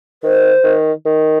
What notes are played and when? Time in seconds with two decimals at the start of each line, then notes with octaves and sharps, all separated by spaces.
0.23 D#3 C5
0.64 D#3
1.06 D#3